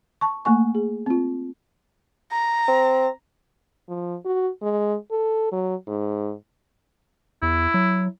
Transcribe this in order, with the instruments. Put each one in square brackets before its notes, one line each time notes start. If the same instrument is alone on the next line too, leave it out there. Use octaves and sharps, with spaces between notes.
[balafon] A5 C#6
A3 A#3 G#5 C#6
G#4
C4 F4
[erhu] A#5
[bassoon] C4
[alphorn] F3
F#4
G#3
A4
F#3
G#2
[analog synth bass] E2 [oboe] E4
[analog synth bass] F#3